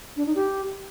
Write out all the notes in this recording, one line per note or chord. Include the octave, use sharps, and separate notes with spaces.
D4
D#4
G4